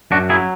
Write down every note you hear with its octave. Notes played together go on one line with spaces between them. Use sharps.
F#2 D4 F#4
F#3 E4 G#4